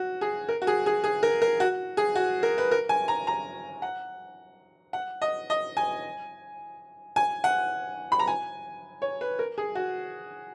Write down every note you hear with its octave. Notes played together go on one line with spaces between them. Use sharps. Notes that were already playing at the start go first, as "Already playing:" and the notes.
Already playing: F#4
G#4
A#4
F#4
G#4
G#4
G#4
A#4
A#4
F#4
G#4
F#4
A#4
B4
A#4
G#5
A#5
A#5
F#5
F#5
D#5
D#5
G#5
G#5
F#5
B5
A#5
G#5
C#5
B4
A#4
G#4
F#4